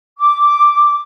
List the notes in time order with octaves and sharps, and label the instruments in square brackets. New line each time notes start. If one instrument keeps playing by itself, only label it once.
[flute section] D6